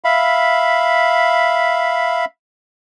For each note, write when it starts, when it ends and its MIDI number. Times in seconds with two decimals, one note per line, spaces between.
0.04 2.25 76
0.04 2.25 77
0.04 2.25 83